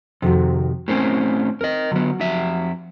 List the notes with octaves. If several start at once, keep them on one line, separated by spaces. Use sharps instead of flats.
F2 C3 D#3 F#4
A2 C4 C#4 A#4
C4 A#4 D#5
D3 F#3 B3
F2 E5